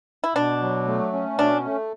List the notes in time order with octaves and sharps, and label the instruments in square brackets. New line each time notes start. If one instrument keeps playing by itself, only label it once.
[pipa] E4
[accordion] B2 [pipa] D4
[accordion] F#3
A3
C#4
[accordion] B2 [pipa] D4
[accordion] A3